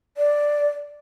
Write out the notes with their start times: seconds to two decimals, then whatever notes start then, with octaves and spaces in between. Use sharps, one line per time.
0.17 D5